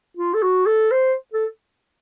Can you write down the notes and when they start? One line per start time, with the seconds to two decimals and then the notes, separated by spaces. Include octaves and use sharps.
0.17 F4
0.34 A4
0.42 F#4
0.66 A4
0.91 C5
1.34 A4